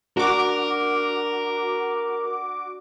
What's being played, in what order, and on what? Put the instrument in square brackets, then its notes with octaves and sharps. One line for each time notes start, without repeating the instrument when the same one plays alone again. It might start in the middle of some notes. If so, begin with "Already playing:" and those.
[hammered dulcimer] D4 [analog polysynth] F#4 D6 [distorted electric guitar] A#4